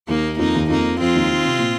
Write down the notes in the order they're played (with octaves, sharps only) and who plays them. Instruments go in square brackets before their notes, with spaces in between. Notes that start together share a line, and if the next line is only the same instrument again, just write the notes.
[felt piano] D#2 D#3 [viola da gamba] A#3 D#4
[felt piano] F2 F3 [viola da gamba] A#3 D#4
[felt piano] D#2 D#3
[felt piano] F2 F3 [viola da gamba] A#3 D#4
[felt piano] F2 F3 [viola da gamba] C4 F4
[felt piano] D#2 D#3
D#3
C3
A#2